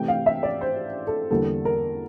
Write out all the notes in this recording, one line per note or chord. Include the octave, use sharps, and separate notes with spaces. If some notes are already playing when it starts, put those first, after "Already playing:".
Already playing: C3 E3 A3 G5
F5
E5
D5
C5
A4
E2 D3 G3 A#3 A4
A#4